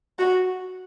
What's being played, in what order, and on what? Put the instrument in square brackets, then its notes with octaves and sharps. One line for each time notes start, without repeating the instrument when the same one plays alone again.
[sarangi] F#4